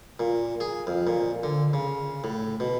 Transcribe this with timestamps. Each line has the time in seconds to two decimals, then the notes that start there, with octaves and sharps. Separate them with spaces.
0.19 A#2
0.60 G#4
0.87 F2
1.07 A#2
1.43 D3
1.73 C#3
2.24 A2
2.60 B2